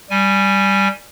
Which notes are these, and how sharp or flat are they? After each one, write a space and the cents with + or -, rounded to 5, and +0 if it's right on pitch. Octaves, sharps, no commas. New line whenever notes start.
G3 +0 G#5 +0